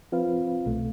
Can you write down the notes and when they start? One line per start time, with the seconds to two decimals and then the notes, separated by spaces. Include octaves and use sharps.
0.12 F3 C4 F4 B4 F5
0.66 C2 B2 A3